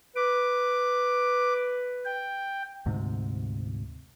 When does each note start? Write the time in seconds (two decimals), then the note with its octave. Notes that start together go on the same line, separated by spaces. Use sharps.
0.16 B4 D6
2.05 G5
2.86 D2 G#2 C3